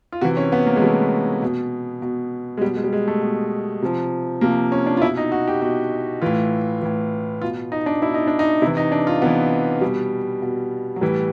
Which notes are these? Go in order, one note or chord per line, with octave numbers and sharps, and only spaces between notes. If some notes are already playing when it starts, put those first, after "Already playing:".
F4
C3 E3 F#4
C#4
B3
A#3
G#3
C3 E3 A3
B2
B2
G#3
B2 G3
G#3
G3
G#3
A3
B2
C3 F3
C3 F3 A#3
C#4
D4
F4
B2 E4
D#4
F#4
G4
B2 F#4
A2 E3 F4
A2 E3
B2 F4
D#4
D4
B2 E4
D#4
D4
D#4
C3 E4
E3
D#4
D4
F4
C3 E3 B3
B2 G3
B2
F#3
A2 E3 G3